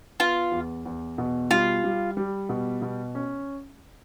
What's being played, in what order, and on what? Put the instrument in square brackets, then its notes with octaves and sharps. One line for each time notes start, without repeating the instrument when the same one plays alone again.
[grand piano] B3 [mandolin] F4
[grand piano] E2
E2
B2
[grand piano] G3 [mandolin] F4
[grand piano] G3
G3
B2
B2
C#4